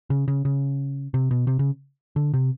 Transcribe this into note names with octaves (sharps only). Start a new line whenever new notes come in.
C#3
C#3
C#3
C3
B2
C3
C#3
D3
C3